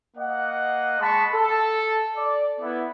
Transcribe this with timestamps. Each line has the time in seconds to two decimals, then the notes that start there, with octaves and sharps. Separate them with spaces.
0.17 A#3 D#5 F#5
1.00 G#3 A5 B5 C#6
1.33 A4
2.16 D5
2.60 B3 E4